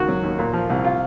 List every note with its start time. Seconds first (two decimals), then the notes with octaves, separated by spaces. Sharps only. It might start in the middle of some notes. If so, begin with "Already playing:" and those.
Already playing: C#2 D#3 F#4
0.08 F#3
0.23 D#2
0.39 A#2
0.53 F3
0.70 C2
0.84 F4